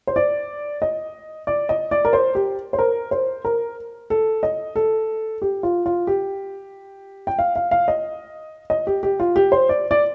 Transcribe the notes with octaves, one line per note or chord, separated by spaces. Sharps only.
C5
D5
D#5
D5
D#5
D5
A#4
C5
G4
C5
A#4
C5
A#4
A4
D#5
A4
G4
F4
F4
G4
G5
F5
F5
F5
D#5
D#5
G4
G4
F4
G4
C5
D5
D5